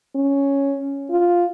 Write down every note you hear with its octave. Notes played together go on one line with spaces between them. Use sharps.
C#4
F4